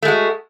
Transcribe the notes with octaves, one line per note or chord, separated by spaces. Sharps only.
G#3 A3 F#4